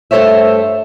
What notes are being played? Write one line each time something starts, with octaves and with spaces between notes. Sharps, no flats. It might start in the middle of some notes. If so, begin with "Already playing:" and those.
G2 A3 A4 C5 C#5 E5